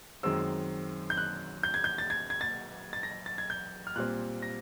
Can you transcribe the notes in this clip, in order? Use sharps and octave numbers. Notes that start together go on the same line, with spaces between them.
F#2 D#3 G#3 C4 E6
G6
F#6
G6
G#6
G6
A6
G#6
G#6
A6
A6
A#6
A6
G#6
G6
F6
A#2 G3 C4 F#6
A#6